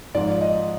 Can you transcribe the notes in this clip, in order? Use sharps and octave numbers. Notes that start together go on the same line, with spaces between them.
G#2 F3 D5
D#5